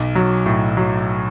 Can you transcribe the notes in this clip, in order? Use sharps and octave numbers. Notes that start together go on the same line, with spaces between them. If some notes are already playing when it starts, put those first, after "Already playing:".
Already playing: B1
F#3
A2
F#3